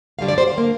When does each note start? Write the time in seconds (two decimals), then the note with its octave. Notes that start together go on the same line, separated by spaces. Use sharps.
0.19 G2 D3 G3 F5
0.28 D5
0.38 C5
0.48 F5
0.57 D3 A#3